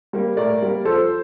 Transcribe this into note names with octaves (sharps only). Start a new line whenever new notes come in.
G3 A#3
A2 A#4 D5
G3 A#3
F2 A4 C5